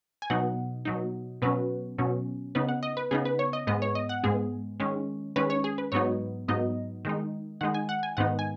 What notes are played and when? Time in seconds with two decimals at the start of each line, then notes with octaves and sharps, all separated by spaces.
0.22 G#5
0.30 B2 F#3 D#4 F#5
0.85 B2 F#3 D#4
1.42 B2 F#3 C#4 B4
1.98 B2 F#3 C#4
2.55 C#3 B3 D#4 B4
2.69 F#5
2.83 D#5
2.97 B4
3.11 C#3 B3 D#4 G#4
3.25 B4
3.39 C#5
3.53 D#5
3.67 G#2 G#3 B3 D#5
3.82 C#5
3.95 D#5
4.09 F#5
4.23 G#2 G#3 B3 G#4
4.80 D#3 G#3 C#4
5.36 D#3 G#3 C#4 B4
5.50 C#5
5.64 G#4
5.78 B4
5.92 G#2 F#3 B3 D#4 C#5
6.48 G#2 F#3 B3 D#4 D#5
7.05 D#3 G#3 D#4
7.61 D#3 G#3 D#4 F#5
7.74 G#5
7.89 F#5
8.03 G#5
8.17 G#2 D#3 B3 D#4 F#5
8.39 G#5